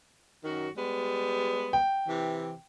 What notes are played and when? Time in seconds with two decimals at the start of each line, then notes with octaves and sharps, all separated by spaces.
0.44 F#2 D#3 F#4
0.76 G3 G#3 B3
1.73 G5
2.08 C3 E3